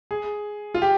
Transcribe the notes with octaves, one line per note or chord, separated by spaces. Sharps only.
G#4
F4
G4